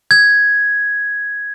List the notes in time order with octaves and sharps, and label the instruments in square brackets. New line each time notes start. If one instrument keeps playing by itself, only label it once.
[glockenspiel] G#6